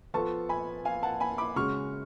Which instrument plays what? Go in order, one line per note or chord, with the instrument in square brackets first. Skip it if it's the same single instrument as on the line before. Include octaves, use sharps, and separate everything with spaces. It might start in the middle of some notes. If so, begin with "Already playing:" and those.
[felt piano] F3 B3 F4 A4 [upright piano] A5 C#6
[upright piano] G#5 B5
F5 G#5
F#5 A5
G#5 B5
B5 D6
[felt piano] C#3 G#3 C#4 F#4 [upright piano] C#6 F6